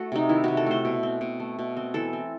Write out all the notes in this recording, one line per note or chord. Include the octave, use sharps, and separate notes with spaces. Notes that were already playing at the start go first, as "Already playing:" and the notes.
Already playing: A3 F#4
C3 D#4
D#3 E4
C3 F#4
A4
A3 C5
B2
C4
B2
A3
B2
C4
E3 A4
C4